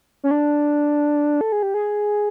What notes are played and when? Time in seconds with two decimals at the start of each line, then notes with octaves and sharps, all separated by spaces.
0.24 C#4
0.31 D4
1.41 A4
1.52 G#4
1.63 G4
1.74 G#4